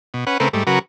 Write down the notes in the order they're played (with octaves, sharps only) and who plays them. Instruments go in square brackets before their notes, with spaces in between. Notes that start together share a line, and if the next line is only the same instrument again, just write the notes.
[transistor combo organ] B2
C#4 B4 F#5
C#3 A3 C4 A#4 B4
G#2 G3 A3
C#3 F#3 F#4 A#4 B4